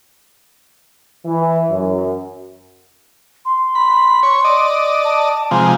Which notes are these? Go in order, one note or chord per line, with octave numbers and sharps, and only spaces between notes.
E3
F#2
C6
B5
C#5
D5 D#5
A5
C3 F3 G#3 A#5